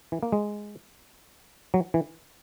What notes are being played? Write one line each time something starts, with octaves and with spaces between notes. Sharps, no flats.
E3
A#3
G#3
F#3
E3